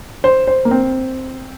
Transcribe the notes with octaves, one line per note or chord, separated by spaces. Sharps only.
C5
C5
A#3
C4